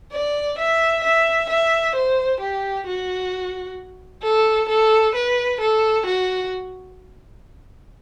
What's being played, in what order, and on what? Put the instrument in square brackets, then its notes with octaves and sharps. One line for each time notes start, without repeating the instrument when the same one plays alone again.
[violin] D5
E5
E5
E5
C5
G4
F#4
A4
A4
B4
A4
F#4